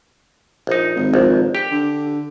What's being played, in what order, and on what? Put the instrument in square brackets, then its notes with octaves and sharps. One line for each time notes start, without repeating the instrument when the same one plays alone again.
[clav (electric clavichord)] A#1 D#4
[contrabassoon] G#1
[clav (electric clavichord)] A#1
G4 G5
[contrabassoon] D3